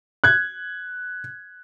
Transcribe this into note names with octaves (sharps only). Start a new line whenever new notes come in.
F#6 G#6